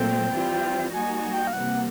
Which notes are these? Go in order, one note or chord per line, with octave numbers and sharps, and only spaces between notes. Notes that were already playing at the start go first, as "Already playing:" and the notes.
Already playing: A#2 F#3 A3 C4 G5
E3 G3 C4 F4
G3 A#3 D#4 F#4 G#5
G#5
G5
F5
C3 E3 G3 A#3 F#5